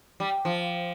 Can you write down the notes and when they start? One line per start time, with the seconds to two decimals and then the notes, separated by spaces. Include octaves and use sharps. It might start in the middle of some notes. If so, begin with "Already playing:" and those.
0.20 G3
0.45 F3